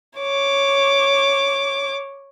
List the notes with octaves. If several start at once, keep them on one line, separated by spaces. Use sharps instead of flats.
C#5 D6